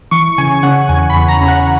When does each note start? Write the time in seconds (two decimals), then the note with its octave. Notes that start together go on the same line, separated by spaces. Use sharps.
0.11 E3 C#6
0.38 C#3 G#5
0.63 C#3 F#5
0.89 E2 G#5
1.10 B5
1.16 E2
1.28 A#5
1.41 C#3
1.48 F#5